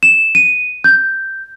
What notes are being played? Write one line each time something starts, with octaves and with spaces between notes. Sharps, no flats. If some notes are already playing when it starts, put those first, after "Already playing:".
E7
D#7
G6